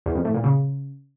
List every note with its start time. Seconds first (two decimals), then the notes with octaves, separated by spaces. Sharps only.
0.06 E2
0.15 F2
0.25 A2
0.34 A#2
0.44 C#3